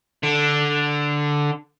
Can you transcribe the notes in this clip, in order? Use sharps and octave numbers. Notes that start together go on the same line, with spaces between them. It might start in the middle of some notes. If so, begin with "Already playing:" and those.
D3